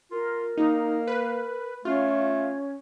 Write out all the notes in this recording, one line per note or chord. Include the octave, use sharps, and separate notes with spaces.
F4 A#4
A#3 D#4
B4
A3 C#4 F4